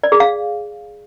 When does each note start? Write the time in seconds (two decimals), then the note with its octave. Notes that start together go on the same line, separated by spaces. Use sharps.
0.03 D5
0.12 G#4
0.20 F5